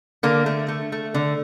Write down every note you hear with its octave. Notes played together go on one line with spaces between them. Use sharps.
D3 A#3
A3
A3
A3
D3